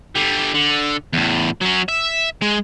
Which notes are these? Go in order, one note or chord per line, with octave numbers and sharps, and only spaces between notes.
D3 G3
D3
E2 A2
F#3 C#4
E5
G#3